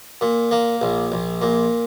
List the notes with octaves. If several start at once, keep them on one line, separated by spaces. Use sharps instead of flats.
A#2
A#3
A#1
A#1
A#2